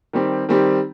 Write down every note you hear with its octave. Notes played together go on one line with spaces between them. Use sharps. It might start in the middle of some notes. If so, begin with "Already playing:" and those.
D#3 G3 C4 G4
D#3 G3 C4 G4